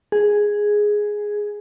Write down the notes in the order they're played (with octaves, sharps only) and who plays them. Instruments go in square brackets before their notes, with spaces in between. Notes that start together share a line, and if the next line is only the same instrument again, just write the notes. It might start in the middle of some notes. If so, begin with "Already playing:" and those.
[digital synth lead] G#4